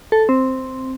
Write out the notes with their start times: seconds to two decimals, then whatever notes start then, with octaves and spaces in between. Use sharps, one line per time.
0.12 A4
0.29 C4